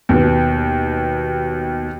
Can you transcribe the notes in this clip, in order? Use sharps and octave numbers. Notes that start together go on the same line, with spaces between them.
D#2 B2